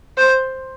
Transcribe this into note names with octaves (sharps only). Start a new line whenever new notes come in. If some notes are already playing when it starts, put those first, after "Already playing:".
C5